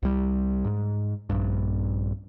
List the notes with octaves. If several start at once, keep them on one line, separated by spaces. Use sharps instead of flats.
C2 G3
G#2
A#1 G2